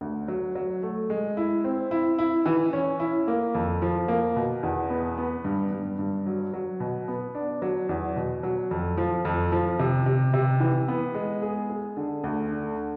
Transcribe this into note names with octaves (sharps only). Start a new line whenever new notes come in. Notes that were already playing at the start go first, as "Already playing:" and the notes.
D2
F#3
F#3
A3
G#3
E4
C4
E4
E4
E3
C#4
E4
A#3
F2
F3
A#3
B2
E2
B3
B3
G2
G2
G2
F#3
F#3
B2
B3
D4
F#3
E2
B2
F#3
F2
F3
F2
F3
C3
C3
C3
E3
B3
G#3
G#4
G#4
D3
D2
D3